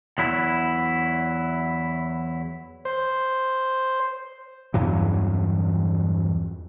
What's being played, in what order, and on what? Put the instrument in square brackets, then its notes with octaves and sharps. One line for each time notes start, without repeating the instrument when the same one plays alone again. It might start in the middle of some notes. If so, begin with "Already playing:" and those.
[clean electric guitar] E2 F#3 E4
[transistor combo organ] C5
[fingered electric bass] E2 G2 E3 F#3